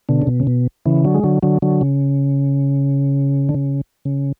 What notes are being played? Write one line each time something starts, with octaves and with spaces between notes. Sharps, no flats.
B2 D3
C#3
B2
C#3
B2
C#3 E3
D3 F#3
G#3
D3 F#3
D3 F#3
D3 F#3
C#3
D3
C#3
C#3